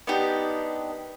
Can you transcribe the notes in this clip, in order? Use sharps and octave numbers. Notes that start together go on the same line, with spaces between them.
B3 D4 D#4 G4